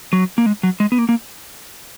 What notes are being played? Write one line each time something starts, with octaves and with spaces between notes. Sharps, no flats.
F#3
A#3
G#3
F#3
G#3
B3
A#3
A#3